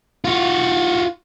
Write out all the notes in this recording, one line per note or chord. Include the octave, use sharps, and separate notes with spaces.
F4 F#4